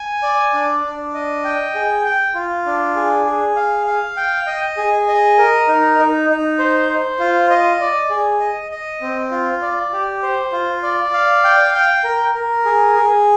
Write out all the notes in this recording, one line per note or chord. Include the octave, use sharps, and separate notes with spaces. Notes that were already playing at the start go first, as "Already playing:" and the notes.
Already playing: G#5
D5
D4
D4
D#5
G5
G#4
G5
F4
D4
G#4
G#4
F5
F5
G5
D#5
G#4
D#5
A#4
D#4
D#4
D#4
C5
C5
F4
D#5
D5
G#4
D#5
D#5
C4
F4
D5
G4
C5
F4
D5
F5
G5
G5
A#4
A#4
G#4
G#4